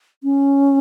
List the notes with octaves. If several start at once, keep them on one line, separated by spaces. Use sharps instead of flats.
C#4